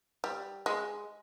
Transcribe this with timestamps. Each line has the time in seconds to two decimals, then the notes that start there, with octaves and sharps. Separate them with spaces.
0.24 G3
0.66 G#3